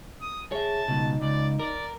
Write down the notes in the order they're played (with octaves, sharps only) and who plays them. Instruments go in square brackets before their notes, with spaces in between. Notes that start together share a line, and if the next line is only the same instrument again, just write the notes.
[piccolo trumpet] D#6
[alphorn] G#4 [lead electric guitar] C#5 E5 [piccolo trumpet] A5
[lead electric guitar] C#2 B2 [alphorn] D#4
[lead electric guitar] C#2 [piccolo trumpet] D5
[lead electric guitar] A#4 [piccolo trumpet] D5